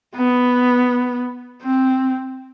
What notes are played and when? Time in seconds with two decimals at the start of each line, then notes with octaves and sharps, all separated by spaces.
0.15 B3
1.62 C4